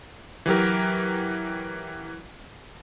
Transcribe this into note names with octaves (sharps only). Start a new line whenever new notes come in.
E3 F#3 G4 A#4